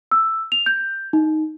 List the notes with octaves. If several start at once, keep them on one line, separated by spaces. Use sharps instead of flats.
E6
F7
G6
D#4